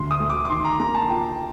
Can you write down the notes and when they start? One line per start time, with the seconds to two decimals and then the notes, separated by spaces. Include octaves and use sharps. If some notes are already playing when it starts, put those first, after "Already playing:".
Already playing: D2 D4 C6
0.11 D#6
0.20 A3
0.30 D6
0.45 D6
0.49 D#3 C6
0.65 A#5
0.80 A#3 A#5
0.95 A5
1.08 F4 G5